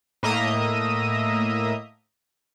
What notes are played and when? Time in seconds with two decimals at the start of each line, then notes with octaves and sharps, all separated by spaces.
0.23 A2 A#3 D#5 E5 A#5 D#6